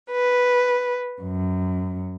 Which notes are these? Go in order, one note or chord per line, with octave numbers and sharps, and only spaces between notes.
B4
F#2